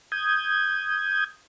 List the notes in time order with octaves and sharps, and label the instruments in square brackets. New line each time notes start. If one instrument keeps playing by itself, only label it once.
[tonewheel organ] D#6 G6 G#6